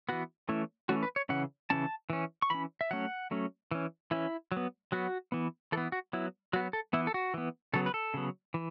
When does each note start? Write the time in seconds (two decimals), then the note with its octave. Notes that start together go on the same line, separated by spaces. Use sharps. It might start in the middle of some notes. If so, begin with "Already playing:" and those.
0.09 E3 B3 F#4
0.49 E3 A3 C#4 E4
0.89 E3 A3 C#4 F#4
1.03 B4
1.16 C#5
1.29 C#3 E3 C#4 F#5
1.70 C#3 E3 C#4 A5
2.10 E3 C#4
2.42 C#6
2.50 E3 C#4 B5
2.81 E5
2.91 F#3 A3 C#4 F#5
3.31 F#3 A3 C#4
3.71 E3 C#4
4.11 E3 C#4 E4
4.52 F#3
4.57 B3
4.92 F#3 B3 F#4
5.32 E3 B3
5.72 E3 A4
5.77 B3
5.92 F#4
6.13 F#3 B3 E4
6.53 F#3 B3 F#4
6.73 A4
6.93 E3 B3 E4
7.07 A4
7.14 F#4
7.34 E3 B3
7.73 C#3 F#3 B3 A4
7.86 B4
7.94 A4
8.14 C#3 F#3 B3
8.54 E3